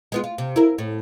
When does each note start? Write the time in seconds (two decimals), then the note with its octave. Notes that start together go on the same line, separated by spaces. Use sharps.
0.12 G#3 B3 F4
0.24 F4
0.38 C3
0.56 E4 A#4
0.78 A2